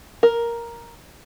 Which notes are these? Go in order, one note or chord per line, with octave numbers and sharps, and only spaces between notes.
A#4